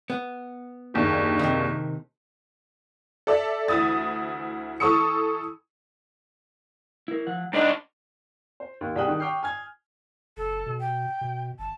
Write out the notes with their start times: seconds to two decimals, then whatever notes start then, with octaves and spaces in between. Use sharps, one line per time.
0.10 B3
0.94 F#1 D#2 D4
1.39 C3 D#3
3.27 A4 D5 E5
3.68 D2 E3 E4 D#6 A6
4.80 E3 A4 C#6 D#6 E6 C#7
7.08 E4 A#4
7.27 F3 F#5
7.53 C2 D4 D#4 D#5
8.60 C5
8.81 D#2
8.96 C2 G#4 G5 D#6 F#6
9.08 D#3
9.20 G5 C#6 D6 F6 G6 C7
9.43 G#5 F6 G#6
10.37 F#1 A4
10.66 B2
10.80 G5
11.21 B2
11.59 G1 A5